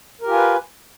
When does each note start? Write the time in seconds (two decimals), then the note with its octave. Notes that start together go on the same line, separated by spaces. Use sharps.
0.21 A#4
0.24 G4
0.28 F4
0.31 G#5
0.35 B4